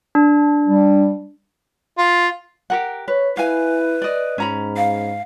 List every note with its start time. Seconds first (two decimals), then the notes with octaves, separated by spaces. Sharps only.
0.15 D4
0.67 G3
1.98 F4
2.70 G4 A#4 F#5
3.08 B4 C#5
3.37 E4 B4 F5 G#5
4.02 D5 D#5
4.38 G#2 C#4 A#5 B5
4.77 F5